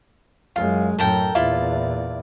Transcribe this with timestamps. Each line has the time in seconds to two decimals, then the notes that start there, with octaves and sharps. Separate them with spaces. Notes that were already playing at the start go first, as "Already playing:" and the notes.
0.56 F#2 G#3 F4
0.99 F#2 A2 A4 A#4 G5
1.35 E2 A#2 E4 F4 D5